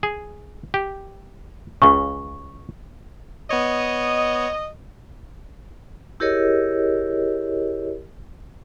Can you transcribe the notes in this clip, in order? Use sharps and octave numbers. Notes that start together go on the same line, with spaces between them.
G#4
G4
C#2 C#3 C#6
B3 C#5 D#5
E4 G4 G#4 A#4 C#5 D#5